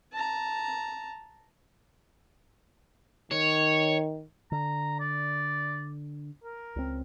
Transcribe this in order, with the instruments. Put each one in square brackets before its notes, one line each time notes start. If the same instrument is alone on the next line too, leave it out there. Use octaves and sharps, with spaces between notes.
[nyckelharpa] A5 A#5
[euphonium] D#3 [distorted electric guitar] C#5
[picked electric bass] D3 [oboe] A#5
[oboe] D5
A#4
[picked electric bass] C#2 C4